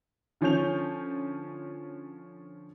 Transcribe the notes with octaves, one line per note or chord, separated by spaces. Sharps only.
D3 F3 C#4 C#5 G6 F7